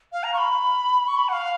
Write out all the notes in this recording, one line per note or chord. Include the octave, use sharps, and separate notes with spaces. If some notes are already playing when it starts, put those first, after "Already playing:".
F5
A#5
C#6
B5
C#6
B5
F#5
F5